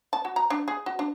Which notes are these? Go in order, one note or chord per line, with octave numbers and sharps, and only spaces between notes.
A5
F#4
A#5
D4
G#4
F#4
D4